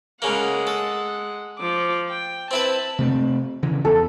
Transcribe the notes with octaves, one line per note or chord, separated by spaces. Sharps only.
C#3 G#3 A#3 F#5
A4
F3 D6
G5
C4 E4 B4 A5
C3 A3 C4
C#3 E3
E2 A4